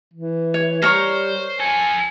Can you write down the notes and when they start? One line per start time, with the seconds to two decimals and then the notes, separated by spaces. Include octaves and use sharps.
0.13 E3
0.54 C#5
0.82 G3 A#4 C5 C#5 C#6
1.60 F3 A4 G#5